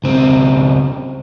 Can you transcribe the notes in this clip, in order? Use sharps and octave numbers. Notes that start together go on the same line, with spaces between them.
C#2 C4